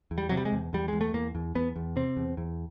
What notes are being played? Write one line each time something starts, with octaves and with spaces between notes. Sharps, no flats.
E2
G3
C3 F#3
G3
G#3
E2
E2 G3
E2 G#3
A3
E2 A#3
E2
E2 B3
E2
C3 C4
E2
E2